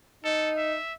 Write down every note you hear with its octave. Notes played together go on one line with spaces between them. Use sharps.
D#4 A4
E5